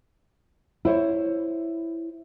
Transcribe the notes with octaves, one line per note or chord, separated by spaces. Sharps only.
E4 C5 C#5